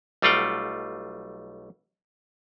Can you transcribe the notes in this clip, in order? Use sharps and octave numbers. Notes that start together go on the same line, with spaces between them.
B1 G3 A3 F4 F#5 G5